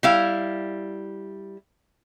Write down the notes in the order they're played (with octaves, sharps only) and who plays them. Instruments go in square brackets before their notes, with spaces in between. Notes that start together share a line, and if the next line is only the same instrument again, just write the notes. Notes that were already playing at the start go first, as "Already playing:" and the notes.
[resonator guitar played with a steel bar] G3 E4 F5